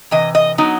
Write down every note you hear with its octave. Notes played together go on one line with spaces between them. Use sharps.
C3 E3 D#5
D#5
F#3 B3 D#4